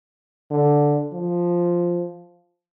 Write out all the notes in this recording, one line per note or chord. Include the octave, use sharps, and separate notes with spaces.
D3
F3